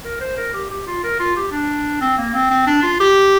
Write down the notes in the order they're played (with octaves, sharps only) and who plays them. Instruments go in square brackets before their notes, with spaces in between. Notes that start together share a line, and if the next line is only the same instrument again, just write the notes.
[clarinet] A#4
C5
A#4
G4
G4
F4
A#4
F4
G4
D4
C4
A#3
C4
C4
D4
F4
G4